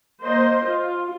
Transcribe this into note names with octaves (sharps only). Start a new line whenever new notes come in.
A#3 C5 D#5
F4